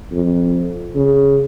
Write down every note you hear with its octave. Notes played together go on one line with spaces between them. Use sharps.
F2
C#3